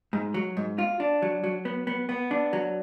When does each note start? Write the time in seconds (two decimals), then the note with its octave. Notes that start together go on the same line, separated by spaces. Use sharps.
0.13 G#2
0.34 F#3
0.57 G#2
0.78 F4
1.00 D4
1.22 F#3
1.44 F#3
1.65 B3
1.87 B3
2.09 B3
2.31 D4
2.53 F#3